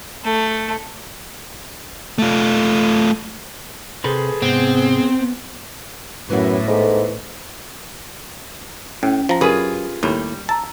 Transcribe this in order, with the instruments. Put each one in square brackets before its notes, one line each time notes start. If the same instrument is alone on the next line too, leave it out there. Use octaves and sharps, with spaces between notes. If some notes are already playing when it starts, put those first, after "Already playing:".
[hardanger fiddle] A3
[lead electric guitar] A3 F4
[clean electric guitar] C3 C5 [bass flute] G#4 [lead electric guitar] A4 B4
[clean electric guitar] G#2 C3 G#3 [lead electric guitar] B3 [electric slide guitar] C4
[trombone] F#2 [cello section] A2 [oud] E3 B3
[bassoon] G#2 [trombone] A4
[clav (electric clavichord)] A2 [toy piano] C#4 G5
[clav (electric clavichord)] F3 A#5
[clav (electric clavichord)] F#2 [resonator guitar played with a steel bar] F4 G#4 B4 [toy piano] G4 A#4 D#6
[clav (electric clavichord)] D#2 A2 [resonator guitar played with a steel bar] G3
[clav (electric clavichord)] A5 [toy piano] A#5 E6